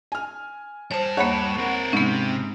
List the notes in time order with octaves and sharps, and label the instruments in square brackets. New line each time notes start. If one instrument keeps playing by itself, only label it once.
[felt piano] G#5 F6
[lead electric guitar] G2 A5 [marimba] C5 C#5
[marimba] D#2 A#3 [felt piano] C#5 F#5 B5
[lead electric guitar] C4 A#4
[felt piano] G#2 [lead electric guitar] C3 [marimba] B3 C#4